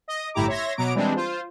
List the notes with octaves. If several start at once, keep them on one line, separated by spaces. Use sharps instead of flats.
D#5
G1 A2 E4 G4 A#5 D6
C#5 E5 C6 G#6 A#6
B2 F#3 B3 A#5 D6 D7
E3 G3 G#3 C4 D4
F4 C5